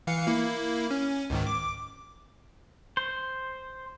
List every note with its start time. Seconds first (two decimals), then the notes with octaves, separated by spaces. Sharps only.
0.07 E3 F5 C#7
0.27 A#3 E4
0.91 C#4
1.30 C#2 G#2 D#3
1.47 D6
2.97 C5